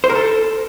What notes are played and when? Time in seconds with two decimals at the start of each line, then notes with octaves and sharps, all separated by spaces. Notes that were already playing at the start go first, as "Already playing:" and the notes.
0.04 C5
0.10 A#4
0.15 A4